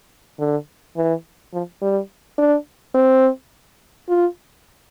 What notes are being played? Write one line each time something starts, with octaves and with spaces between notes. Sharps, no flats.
D3
E3
F3
G3
D4
C4
F4